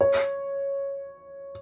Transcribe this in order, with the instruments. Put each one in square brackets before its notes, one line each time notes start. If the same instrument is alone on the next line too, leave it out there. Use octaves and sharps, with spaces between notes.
[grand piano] C#5